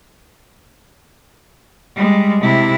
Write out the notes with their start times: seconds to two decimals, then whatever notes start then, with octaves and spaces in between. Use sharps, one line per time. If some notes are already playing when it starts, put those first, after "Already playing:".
1.96 G3 G#3
2.42 C3 E4